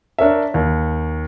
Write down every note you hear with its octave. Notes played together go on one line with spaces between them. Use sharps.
D4 A#4 C#5 E5
D#2